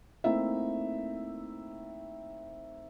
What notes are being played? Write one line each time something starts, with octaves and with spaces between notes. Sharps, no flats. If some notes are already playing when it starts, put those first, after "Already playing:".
A3 A#3 C4 D#4 E4 E5